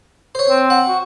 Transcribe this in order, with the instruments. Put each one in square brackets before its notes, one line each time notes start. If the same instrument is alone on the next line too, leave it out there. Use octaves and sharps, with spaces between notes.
[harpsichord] C5 C#5
[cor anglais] C4
[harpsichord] F#5
[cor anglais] F#4